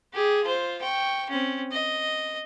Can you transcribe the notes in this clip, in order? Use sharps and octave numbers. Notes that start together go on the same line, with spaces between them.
G4 G#4
F4 C5
G5 C#6
C4 C#4
D#5